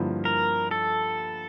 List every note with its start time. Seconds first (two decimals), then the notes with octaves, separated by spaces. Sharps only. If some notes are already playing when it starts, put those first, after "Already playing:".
Already playing: G2 D3 F3 A#3 E4
0.25 A#4
0.71 A4